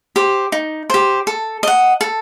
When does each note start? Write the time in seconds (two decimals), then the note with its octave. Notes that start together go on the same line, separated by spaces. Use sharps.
0.16 G4 C5
0.52 D#4
0.90 G4 C5
1.27 A4
1.63 D#5 F#5
2.01 A4